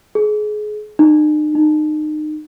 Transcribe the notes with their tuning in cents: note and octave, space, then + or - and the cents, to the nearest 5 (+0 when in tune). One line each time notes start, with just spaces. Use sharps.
G#4 +25
D#4 -45
D#4 -30